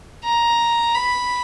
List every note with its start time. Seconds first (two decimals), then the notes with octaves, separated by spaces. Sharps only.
0.25 A#5
0.95 B5